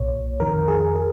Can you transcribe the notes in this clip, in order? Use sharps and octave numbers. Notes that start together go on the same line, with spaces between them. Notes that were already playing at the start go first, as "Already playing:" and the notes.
Already playing: B1 A#2 C#5
F2 D#3 A#4
G#4
G#4